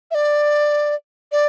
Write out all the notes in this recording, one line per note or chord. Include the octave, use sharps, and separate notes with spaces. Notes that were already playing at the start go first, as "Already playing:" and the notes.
E5
D5
D5